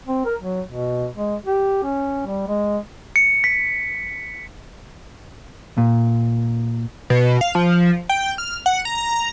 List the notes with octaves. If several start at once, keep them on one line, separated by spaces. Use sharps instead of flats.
C4
A#4
F#3
B2
G#3
G4
C#4
G3
G#3
C#7
B6
A#2
B2
F5
F3
G5
F6
F#5
A#5